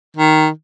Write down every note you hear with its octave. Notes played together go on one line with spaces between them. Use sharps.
D#3